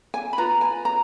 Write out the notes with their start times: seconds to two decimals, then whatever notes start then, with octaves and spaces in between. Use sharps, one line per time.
0.14 G#5
0.33 B5
0.38 F4 B4 A#5
0.61 G#5
0.85 A#5